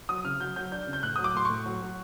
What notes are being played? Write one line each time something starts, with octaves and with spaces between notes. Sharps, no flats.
F#3 D#6
C#3 F6
F#3 G6
F#3 G6
D4 G6
C#3
G6
A2 F#6
F#3 D#6
D6
A2 C6
A2 C#6
F#3
F#3